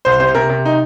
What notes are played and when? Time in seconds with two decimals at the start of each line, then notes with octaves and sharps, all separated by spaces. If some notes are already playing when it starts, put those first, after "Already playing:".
0.05 C2 C5
0.20 C3 C5
0.35 C3 A#4
0.49 C3
0.65 D#4